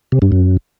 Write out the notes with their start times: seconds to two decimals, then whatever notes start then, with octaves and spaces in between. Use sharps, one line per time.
0.12 C3
0.22 G2
0.32 F#2